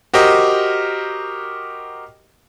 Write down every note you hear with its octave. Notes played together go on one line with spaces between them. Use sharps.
F#4 G4 A#4 C5 D#5